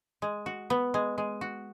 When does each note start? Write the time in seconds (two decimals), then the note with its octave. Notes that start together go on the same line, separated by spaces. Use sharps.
0.22 G#3
0.46 F#4
0.70 B3
0.94 G#3
1.18 G#3
1.41 F#4